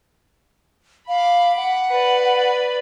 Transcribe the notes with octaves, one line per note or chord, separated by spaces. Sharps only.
F5 B5 D6
F#5
B4 D5